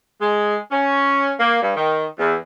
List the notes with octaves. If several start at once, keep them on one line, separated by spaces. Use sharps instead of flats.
G#3
C#4
A#3
G2
D#3
E2